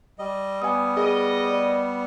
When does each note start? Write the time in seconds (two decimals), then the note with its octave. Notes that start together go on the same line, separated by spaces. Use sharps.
0.19 G3 D#5
0.62 G3 B3 G#5 D#6
0.97 G#4 A#4 D#5
1.45 D5